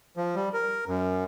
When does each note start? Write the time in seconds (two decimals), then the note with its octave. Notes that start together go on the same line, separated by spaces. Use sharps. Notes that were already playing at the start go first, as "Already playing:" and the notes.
0.17 F3
0.35 G3
0.53 A#4
0.88 F#2